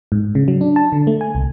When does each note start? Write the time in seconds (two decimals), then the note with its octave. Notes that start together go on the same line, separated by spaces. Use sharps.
0.12 G#2
0.35 C#3
0.48 F#3
0.61 D4
0.76 A5
0.92 D3
1.07 A3
1.21 G#5
1.35 C2